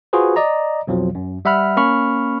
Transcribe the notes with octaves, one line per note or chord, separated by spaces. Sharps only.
F4 F#4 G#4 B4 C5
D5 D#5 A#5
B1 F2 B2 F3 F#3
F#2
G3 E5 F#5 B5 F6
A#3 C#4 B5 C#6 F6